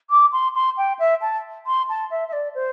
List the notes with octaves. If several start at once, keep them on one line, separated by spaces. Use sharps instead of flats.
D6
C6
C6
G5
E5
A5
C6
A5
E5
E5
D5
C5